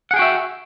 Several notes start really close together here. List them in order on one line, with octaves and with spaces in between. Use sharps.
F#5 G#4 G5 F#4 E5